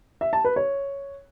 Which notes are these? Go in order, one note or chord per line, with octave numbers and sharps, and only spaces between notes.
E5
A5
B4
C#5